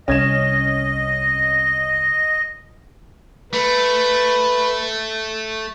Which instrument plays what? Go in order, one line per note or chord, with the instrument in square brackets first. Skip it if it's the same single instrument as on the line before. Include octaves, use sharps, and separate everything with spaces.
[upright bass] C2 [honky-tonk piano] C#4 G#6 E7 [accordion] D#5
[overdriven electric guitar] A3 [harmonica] B4